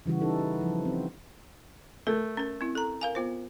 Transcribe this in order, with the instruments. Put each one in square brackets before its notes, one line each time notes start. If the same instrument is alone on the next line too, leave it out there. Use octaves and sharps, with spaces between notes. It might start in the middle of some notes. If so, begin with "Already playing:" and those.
[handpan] C#3 E3 G3 F#4
D#4 A4
F3
C4
[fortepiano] A3 [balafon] A#4
[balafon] C#4 A#4
C4 E4
A4 A#5
A#4 F5 G#5
B3 F4 C5